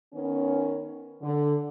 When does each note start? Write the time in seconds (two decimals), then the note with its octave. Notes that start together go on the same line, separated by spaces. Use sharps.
0.14 D#3 B3 C#4
1.22 D3